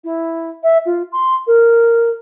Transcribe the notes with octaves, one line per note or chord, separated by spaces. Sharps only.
E4
E5
F4
C6
A#4